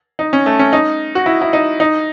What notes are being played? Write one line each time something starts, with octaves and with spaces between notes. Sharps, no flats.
D#4
C#4
A3
C#4
D#4
F#4
E4
E4
D#4
D#4